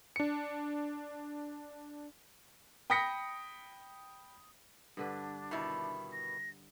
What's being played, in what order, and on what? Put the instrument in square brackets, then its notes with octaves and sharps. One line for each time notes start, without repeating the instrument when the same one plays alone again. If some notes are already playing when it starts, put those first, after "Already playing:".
[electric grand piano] D4 C#7
[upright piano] G5 B5 D#6 A#6 B6 C#7
[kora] G2 D3 B4 [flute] D4
[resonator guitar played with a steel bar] B2 D#3 E4
[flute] A#6